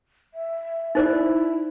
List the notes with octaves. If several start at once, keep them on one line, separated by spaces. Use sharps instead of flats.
E5
D#4 E4 C5 D5